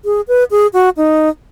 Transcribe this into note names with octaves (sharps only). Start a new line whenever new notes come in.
G#4
B4
G#4
F#4
D#4